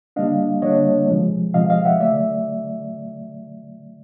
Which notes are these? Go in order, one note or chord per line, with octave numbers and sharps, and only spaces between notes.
D3 G3 A#3 D4 D#5 F5
D3 G3 A#3 D4 C#5 D#5
C3 F3 G#3
C3 F3 G#3 D#5 F5
D#5 F5
E5 F#5
D3 F#3 A3 D5 E5